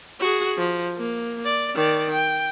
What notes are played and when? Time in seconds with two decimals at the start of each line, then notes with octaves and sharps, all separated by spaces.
0.20 F#4 G#4
0.57 F3
0.97 A#3
1.45 D5
1.75 D#3 D5
2.11 G5